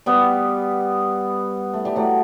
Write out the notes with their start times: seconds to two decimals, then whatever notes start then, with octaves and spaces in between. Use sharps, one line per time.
0.06 G3 B3
1.74 A3
1.85 G3
1.96 F#3 A3